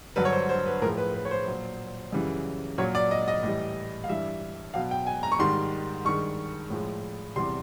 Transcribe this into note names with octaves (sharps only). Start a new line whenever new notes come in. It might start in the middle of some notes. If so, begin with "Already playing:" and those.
G2 D3 F#3 B4
C#5
C5
C5
B4
A2 F3 G#3 A#4
B4
B4
C#5
C5
A#2 F#3
F#2 C#3 E3 G3
A#2 F#3 C#5
D5
D#5
D#5
A2 E3 G3
F5
G2 E3 G3 E5
B2 F#3 F5
G5
G#5
A#5
C#6
G#2 D#3 G3 C6
G2 D#3 G#3 C#6
A2 F3 G#3
E2 C3 E3 G3 C6